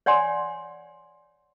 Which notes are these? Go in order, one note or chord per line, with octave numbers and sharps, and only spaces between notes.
C#5 D5 F#5 G#5 C6